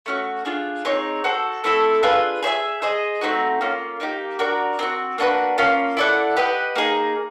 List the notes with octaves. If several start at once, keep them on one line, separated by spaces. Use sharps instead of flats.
A3 C#4 F#4
D4 F4 G#4
C4 D#4 G#4 C#5
F#4 A4 C5
A3 C4 E4 A4
D4 F4 G#4 B4
G#4 C5 E5 G#5
G#4 C5 D#5
A3 C4 D#4 F#4
A#3 C#4 F4
A#3 D#4 G4
D4 F#4 A#4 D5
C4 D#4 F#4
A#3 D4 F#4 B4
A#3 C#4 F4
E4 A4 D5 F#5
G4 B4 D#5 F#5
A#3 D#4 G#4